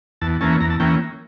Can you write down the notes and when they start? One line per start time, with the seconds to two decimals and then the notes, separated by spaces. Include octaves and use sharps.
0.21 E2 A5
0.41 E3 A#3 C#4 A5
0.61 E2 A#5
0.70 A5
0.80 E3 A#3 C#4 G5